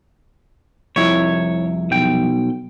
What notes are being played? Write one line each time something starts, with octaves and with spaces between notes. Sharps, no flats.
C2 F2 E4 C#5
B1 G5